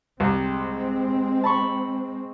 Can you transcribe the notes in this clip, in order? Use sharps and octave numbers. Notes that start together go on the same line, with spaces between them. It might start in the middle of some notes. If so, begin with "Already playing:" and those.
C2 G#3 C4
A5 B5 C#6